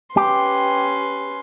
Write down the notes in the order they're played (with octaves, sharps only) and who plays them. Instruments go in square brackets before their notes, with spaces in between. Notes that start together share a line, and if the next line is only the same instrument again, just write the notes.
[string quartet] C#4 B4 C6 [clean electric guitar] G4